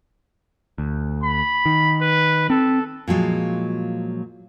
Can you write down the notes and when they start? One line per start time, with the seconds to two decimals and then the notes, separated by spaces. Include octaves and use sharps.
0.78 D2
1.23 B5
1.66 D#3
2.02 B4
2.50 C4 A4
3.08 A#2 F3 F#3 G#3